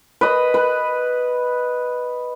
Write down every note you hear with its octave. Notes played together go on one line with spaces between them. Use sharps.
B4 D#5
B4